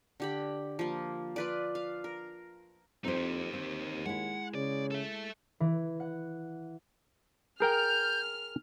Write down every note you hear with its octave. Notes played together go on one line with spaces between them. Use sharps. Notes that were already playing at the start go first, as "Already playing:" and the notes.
D3 G4 B5
F3 A#3
F4 B4 D5
F5
A#4
F2 C4 D#4 E4 G4 C5
D#2 C4
G#3 E4 F#5
C#3 D5
A4 E5
E3
F#5
G#4 A#4 G5 F6 G6